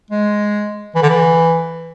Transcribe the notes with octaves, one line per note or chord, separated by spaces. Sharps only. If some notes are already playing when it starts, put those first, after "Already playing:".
G#3
E3
D3
E3